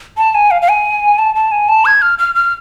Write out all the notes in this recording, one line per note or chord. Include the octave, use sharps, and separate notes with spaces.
A5
G#5
F5
F5
G#5
A5
A5
G#5
A5
G#6
F6
F6
F6